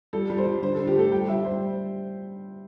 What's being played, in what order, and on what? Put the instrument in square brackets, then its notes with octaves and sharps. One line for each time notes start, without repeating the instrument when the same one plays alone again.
[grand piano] G3 A4
G3
C5
G3
D3 C5
D3 A4
G4
A3 A4
G3 G5
G3 E5
G3 C5